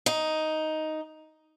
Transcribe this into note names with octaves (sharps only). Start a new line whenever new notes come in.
D#4